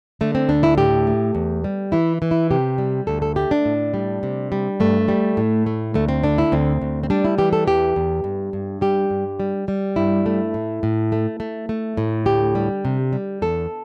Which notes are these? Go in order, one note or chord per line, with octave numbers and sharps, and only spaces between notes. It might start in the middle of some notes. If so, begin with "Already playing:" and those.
D3 A3
C4
D2 D4
E4
A2 G4
A3
E2
G3
E3 E4
E3
E4
C3 G4
G3
D2 A4
A4
A3 G4
D4
A2
G3
C3
G3
G2 A3
G3
A2
A3
D2 A3
C4
D3 D4
E4
D2 C4
D2
C4
G3 D4
E4
E3 G4
A4
E2 G4
E2
G2
G2
G3 G4
G2
G3
G3
G2 E4
A3
A2
A2
A3
A3
A3
A2
D2 G4
G3
C3
G3
E2 A4